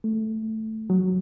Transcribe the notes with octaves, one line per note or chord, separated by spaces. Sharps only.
A3
F#3